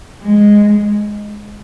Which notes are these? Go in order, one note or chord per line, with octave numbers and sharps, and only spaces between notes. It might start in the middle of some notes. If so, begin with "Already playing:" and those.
G#3